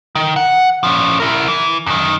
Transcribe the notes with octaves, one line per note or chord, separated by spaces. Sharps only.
D#3
F#5
F3 C#4
E4 A#4
E3
F#2 D#3